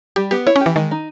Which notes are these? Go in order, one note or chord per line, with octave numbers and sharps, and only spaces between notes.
G3 G4
B3 G4
E4 C#5
C#4
G4
E3
D#3 G#3
D#4